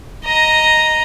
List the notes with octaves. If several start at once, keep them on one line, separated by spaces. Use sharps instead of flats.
D#5 A#5